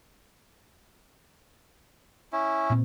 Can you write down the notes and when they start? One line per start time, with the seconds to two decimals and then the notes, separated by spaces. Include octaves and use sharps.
2.32 C#4 E4
2.70 A#2 C4